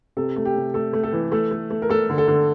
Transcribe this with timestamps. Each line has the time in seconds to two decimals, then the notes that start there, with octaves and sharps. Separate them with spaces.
0.17 C3 A4
0.36 A3
0.45 G4
0.56 C3
0.74 A3 A4
0.93 A3
1.03 A4
1.12 E3
1.32 A3 A4
1.51 A3
1.70 A3
1.82 A#4
1.89 A3 A4
2.10 D3
2.18 A4
2.28 D3